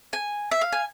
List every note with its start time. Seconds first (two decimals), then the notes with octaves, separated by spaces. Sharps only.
0.13 G#5
0.51 E5
0.61 F5
0.72 G#5